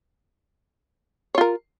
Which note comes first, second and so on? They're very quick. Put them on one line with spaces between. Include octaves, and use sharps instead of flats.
C#5 F4 A#4